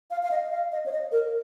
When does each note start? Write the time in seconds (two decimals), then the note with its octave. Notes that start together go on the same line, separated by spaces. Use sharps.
0.11 F5
0.23 F5
0.31 D#5
0.52 F5
0.72 D#5
0.86 C#5
0.91 D#5
1.12 A#4